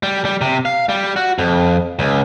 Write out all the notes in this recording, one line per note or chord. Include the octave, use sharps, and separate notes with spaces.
G3
G3
C3
F5
G3
F#4
F2
C#2